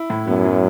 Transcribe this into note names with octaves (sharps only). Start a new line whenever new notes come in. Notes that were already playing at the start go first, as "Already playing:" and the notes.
Already playing: E4
A2
F#2 B3
F#3